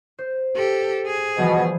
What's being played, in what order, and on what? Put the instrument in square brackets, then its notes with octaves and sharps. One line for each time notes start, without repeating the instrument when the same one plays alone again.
[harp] C5
[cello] G4 A4
G#4
[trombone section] B2 [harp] E3 F3 G3